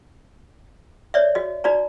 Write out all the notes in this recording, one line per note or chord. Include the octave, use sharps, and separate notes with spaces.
C#5 D5 E5
F#4 D#5
D#4 F#4 D5 A#5